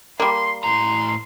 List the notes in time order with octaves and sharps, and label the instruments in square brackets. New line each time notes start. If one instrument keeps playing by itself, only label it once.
[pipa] G3 A#3 [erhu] C6
[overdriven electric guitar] A2 A#5 [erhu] C6